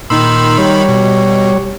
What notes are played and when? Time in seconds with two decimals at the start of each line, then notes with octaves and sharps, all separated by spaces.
0.10 A#2 D#3 D#4 B5 C6 E6
0.58 G3 C#5
0.89 B2